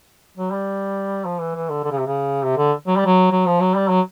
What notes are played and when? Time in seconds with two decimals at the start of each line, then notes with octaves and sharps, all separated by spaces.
0.37 F#3
0.52 G3
1.25 F3
1.40 E3
1.55 E3
1.70 D3
1.84 D3
1.92 C#3
1.99 C3
2.06 C#3
2.43 C3
2.57 D3
2.87 F#3
2.97 G3
3.06 F#3
3.31 F#3
3.46 F3
3.61 F#3
3.76 G3
3.90 F#3